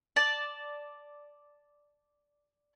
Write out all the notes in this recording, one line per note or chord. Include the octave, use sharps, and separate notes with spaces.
D5 A5